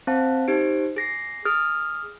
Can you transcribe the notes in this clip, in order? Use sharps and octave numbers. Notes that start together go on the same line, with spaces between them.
C4 C5 F5 A5
D#4 G4 C5 D7
G#4 A#6 C7
G#4 D#6 F6